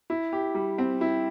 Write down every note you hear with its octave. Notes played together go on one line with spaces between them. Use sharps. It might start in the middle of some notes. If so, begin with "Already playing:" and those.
E4
G4
G3
C4
E4